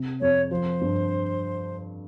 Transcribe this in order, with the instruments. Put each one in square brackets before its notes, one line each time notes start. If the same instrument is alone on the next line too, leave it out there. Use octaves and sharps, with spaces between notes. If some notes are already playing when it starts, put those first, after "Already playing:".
Already playing: [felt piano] C3
[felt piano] F2 [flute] C#5
[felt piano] F3 [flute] C5
[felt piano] G2